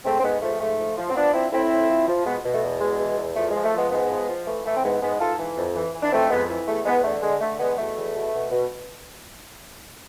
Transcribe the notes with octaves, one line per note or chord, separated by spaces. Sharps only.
G#2 A3 C4
C4
G#2 G#3 B3
F3 A3
G#2 A3
F3
F3
C4
F3 B3 D4
F3 C4 E4
A2 C4 E4
A2
F3
F3
B2 G#3 B3
B2
A3
E2
B2 G#3
E2
E2
F3 A3
G#3
F3
A3
F3 G#3 B3
G#2 G#3 B3
F3
F3
E3 A3
E3 A3
C4
G#2 G#3 B3
G#2 G#3 B3
G#2 F4 A4
E3
F2
E3
E3
D4
F2 A3 C4
F2 G#3 B3
E3
E2 A3
E2 G#3 B3
D3 A3
D3 G#3
D3 A3
E2 G#3 B3
B2 A3
E2
B2
B2
B2